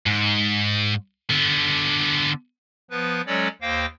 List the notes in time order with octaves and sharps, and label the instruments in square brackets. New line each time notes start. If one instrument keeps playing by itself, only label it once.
[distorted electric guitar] G#2
D3 B3
[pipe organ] F3 B3 B4
F#3 G#3 C#4 A4 C#5 D5
D#2 A#3 C5 F5 G5 A#6